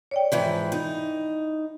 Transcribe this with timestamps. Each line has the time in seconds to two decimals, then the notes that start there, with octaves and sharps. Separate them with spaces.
0.11 C#5 D5 G5
0.32 G#2 E3 F3
0.72 D#4